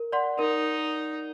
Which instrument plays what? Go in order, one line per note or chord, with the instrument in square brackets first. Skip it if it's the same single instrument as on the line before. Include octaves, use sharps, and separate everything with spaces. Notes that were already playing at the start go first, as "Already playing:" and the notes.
Already playing: [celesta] A#4
D5 F#5 C6
[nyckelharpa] D#4 [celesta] A#4